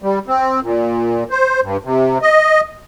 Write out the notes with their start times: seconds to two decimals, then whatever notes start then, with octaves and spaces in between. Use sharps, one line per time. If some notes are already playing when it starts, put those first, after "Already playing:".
0.02 G3
0.27 C4
0.63 A#2
1.31 C5
1.62 G2
1.84 C3
2.22 D#5